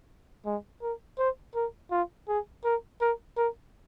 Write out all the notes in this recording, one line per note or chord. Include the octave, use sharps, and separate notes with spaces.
G#3
A#4
C5
A#4
F4
G#4
A#4
A#4
A#4